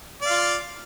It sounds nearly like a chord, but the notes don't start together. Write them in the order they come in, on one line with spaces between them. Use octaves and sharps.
D5 F5 F4